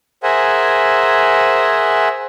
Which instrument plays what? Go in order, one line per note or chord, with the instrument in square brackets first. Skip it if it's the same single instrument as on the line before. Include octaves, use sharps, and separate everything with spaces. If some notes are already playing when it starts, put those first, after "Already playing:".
[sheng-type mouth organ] G#4 A#4 C5 E5 F#5 G#5